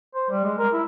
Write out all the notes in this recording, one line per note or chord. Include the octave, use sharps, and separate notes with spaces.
C5
G3
G#3
A#4
E4